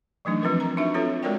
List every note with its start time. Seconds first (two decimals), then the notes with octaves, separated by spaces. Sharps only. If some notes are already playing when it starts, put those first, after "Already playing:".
0.25 E3 F#3 A3 D4 D#4
0.42 F3 C4 F4 A#4 B4
0.60 A#5
0.77 D4 D#4 F#4 E5
0.94 C4 F4 F#4 A4 C#5
1.23 G#3 F#4 A#4 C#5 D5 G5